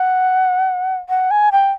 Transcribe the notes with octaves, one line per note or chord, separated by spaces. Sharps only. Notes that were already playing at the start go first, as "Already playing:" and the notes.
Already playing: F#5
F#5
G#5
G5